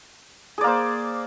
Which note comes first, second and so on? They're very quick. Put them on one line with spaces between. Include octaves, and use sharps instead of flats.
G#4 D5 A#3 C5